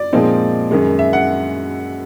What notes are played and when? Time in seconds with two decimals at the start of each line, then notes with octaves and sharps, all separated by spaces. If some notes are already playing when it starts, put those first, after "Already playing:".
Already playing: D5
0.13 A#2 F3 G#3 C4 D#4
0.71 F#2 D#3 G#3
0.99 E5
1.13 F#5